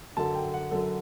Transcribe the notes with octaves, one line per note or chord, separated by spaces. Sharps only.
F#2 D3 F#3 A5
G5
F#5
F#2 D3 F#3 A4